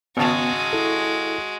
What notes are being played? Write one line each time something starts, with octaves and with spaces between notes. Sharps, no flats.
G#1 C#3 G#3 B3 F#4 A5
E4 A4